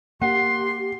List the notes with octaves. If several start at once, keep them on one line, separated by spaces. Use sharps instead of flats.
A#3 G4 F#5 C6